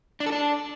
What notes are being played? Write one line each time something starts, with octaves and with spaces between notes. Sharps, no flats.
D4
A4
D4